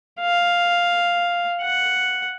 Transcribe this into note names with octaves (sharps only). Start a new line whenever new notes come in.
F5
F#5